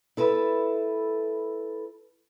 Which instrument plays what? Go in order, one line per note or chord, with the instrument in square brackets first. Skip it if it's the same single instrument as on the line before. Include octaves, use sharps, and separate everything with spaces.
[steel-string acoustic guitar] E4 A4 B4